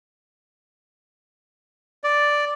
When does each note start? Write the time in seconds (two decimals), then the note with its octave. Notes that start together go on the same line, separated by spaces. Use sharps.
2.04 D5